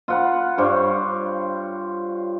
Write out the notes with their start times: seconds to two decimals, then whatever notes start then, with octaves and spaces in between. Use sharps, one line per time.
0.08 F4 F#5 B5
0.58 G2 C5 C#5 C#6